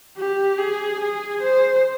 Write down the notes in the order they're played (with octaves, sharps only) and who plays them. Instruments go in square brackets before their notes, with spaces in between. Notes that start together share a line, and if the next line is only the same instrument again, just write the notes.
[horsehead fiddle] G4
G#4
G#4
C5